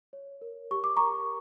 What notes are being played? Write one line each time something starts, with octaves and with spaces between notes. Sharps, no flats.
C#5
A#4
G4 C#6
D6
A#4 A#5 C#6